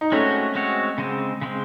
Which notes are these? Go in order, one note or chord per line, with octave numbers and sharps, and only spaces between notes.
D#4
G#3 A3 C4 C#4 F#4 C#5
G#3 C4 F#4 C#5
C#3 G#3 C4
C#3 G#3 C4